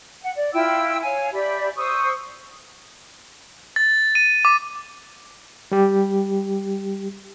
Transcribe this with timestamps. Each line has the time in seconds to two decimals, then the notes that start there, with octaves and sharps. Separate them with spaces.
0.21 F#5
0.36 D5
0.53 E4 F4 G5 E6
1.01 C#5 F5 G#5
1.32 G4 D5 E5 B5
1.76 C5 C#6 D#6 E6
3.76 A6
4.15 D#7
4.45 D6
5.72 G3 G4